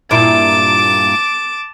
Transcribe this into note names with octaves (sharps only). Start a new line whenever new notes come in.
G2 A#2 E4 A5 D6